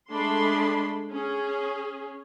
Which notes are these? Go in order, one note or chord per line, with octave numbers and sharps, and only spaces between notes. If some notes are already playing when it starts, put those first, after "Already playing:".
G#3 A3 D4 B5 C6
C#4 G#4